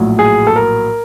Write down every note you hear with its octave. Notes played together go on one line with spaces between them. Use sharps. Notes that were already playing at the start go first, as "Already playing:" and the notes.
Already playing: A#1 A2 F#3
G#4
A4
A#4